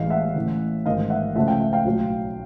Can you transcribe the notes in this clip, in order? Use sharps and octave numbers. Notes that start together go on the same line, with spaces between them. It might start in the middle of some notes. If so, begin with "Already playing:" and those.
Already playing: A1 A2 E3 G#3 D#5 F5
E5 F#5
A1 A2 E3
A1 G#2 D#3 D#5 F5
E5 F#5
C#2 C#3 F3 A3 E5 F#5
F5 G5
E5
F5 G5
B1 A2 F#3